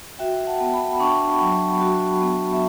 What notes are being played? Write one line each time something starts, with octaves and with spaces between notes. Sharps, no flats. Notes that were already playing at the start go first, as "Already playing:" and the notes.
F#4 E5 G5
F#5 A5
B3
G5 B5
B5
D4 A5 C#6
F#3
F#4
B3
E5